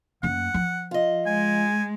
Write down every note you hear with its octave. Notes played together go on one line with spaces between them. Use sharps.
F#2 A#3 F#5
F3
F4 D#5
G#3 G#5